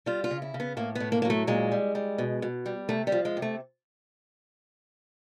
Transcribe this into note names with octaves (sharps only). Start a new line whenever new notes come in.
G3 F4
F4
C#3
E4
C#3
B3
A2 A#3
A2 B3
A#3
A#3
F#3
A3
A#2 G#3
G3
G3
B2
B2
G3
C3 A3
G3
F3
G#3
C3
A3